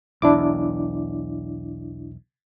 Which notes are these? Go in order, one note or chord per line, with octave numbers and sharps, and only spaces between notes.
B1 E2 D4 E4 D6